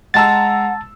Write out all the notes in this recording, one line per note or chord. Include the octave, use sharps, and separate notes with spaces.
G#3 F#5 A5 A#5 E6 A6